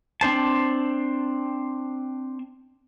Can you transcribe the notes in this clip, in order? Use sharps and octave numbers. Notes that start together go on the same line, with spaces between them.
C4 D4 C5 A5